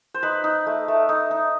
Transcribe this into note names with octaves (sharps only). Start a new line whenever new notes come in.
C5
D#4 B4
D#4
A3
A3
D#4
D#4